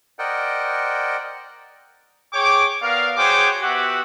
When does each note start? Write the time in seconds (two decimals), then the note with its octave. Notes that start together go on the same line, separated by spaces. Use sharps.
0.19 A#4 C5 D5 D#5 F#5 G5
2.33 G#4 C#5 G5 D6
2.82 B3 A#4 D5 F5
3.16 F#4 G#4 C5 C#5 G5 D6
3.62 B3 F#4 G4 E5 F#5